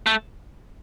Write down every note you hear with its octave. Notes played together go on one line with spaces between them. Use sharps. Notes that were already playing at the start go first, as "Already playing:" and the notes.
A3